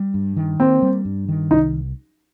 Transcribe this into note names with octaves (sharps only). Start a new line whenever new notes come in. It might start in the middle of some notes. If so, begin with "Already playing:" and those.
Already playing: G3
G2
D#3
A#3 C4
G3
G2
D#3
C2 D#4